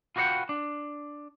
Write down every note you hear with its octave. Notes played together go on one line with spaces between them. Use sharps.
F4 F#4 B4 D#5 F#5 G5
D4